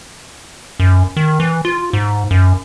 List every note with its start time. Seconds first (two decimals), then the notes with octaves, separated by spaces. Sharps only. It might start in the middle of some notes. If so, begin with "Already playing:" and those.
0.80 F#2
1.17 D#3
1.40 E3
1.65 F4
1.93 G#2
2.31 F#2